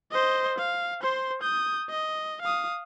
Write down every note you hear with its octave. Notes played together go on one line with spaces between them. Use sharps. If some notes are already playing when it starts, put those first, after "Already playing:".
C5 D#5
F5
C5 C6
D#6 G6
D#5
F5 D#6